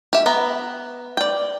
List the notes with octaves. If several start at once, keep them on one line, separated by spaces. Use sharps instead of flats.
G4 E5
B3 A#5
D5 G5